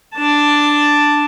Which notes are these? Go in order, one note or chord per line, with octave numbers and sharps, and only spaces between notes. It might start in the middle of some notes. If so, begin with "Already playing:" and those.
D4 A5